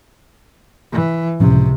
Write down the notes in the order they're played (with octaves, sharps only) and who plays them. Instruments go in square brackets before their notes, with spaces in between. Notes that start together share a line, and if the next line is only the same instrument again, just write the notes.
[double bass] E3
[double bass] C#2 C3 [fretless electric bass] A2 F3 C#4